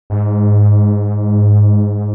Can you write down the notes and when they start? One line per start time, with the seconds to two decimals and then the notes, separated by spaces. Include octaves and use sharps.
0.10 G#2